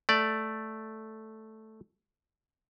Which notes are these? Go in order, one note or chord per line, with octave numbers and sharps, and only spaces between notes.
A3 D5